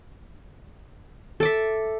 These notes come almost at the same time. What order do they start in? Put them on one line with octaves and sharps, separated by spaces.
A4 D6 E5